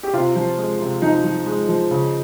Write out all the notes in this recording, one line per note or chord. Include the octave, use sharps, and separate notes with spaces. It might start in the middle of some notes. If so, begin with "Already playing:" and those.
G4
C3 F4
F3
G#3
C3
F3 D#4
F3
G#3
F3
C#3